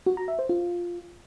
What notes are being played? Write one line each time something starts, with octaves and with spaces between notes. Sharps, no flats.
F#4
A#5
E5
C5
F4